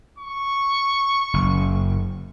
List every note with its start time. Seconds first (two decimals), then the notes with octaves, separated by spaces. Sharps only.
0.19 C#6
1.34 F#1